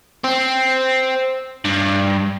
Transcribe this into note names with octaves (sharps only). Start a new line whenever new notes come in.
C4
G2